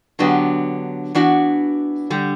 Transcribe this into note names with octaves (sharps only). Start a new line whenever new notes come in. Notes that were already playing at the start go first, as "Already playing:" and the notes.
D3 F#3 B3 D4 G4
E3 B3 D4 F#4
D3 G3